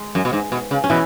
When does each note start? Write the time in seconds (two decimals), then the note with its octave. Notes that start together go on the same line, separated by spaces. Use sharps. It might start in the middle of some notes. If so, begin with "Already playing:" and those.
Already playing: G#3
0.15 F#2
0.25 B2
0.33 G#2
0.52 B2
0.71 C#3
0.84 C#4
0.90 B2 E3 E4